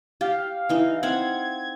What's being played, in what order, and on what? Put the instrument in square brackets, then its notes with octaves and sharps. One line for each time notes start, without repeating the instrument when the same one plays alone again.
[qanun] G4 [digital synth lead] F5
[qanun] E3 D#4
[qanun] C4 F5 F#5 [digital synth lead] G#6